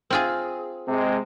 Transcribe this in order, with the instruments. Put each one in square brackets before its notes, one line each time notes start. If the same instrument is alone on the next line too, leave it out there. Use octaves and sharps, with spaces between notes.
[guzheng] C4 F4 G#4
[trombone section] C3 G#3